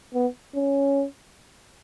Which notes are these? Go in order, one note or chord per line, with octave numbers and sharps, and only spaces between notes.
B3
C#4